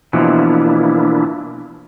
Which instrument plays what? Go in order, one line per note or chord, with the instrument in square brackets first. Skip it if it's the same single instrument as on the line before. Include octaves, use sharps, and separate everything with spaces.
[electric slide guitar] B2 E3 F3 [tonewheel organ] A#3 D4 E4